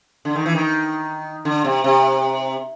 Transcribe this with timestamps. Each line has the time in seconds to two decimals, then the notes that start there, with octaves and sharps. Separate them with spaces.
0.25 D3
0.35 D#3
0.46 E3
0.55 D#3
1.45 D3
1.64 C3
1.84 C3